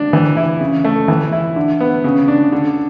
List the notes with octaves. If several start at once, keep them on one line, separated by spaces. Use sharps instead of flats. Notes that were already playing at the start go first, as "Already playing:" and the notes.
Already playing: D4
E3
E4
C#3
A3
E3
E4
D3
B3
C#3
D4
D3